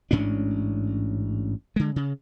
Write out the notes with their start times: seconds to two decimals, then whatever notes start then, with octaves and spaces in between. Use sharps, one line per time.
0.11 A1 G#2 C#4 D4
1.76 D3 G#3
1.96 C#3